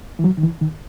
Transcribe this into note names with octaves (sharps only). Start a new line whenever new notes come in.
E3
F#3
D#3
E3
D#3